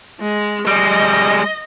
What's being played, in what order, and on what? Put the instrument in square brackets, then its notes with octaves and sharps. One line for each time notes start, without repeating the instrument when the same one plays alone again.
[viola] G#3
[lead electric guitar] G3 G#3 [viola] D#5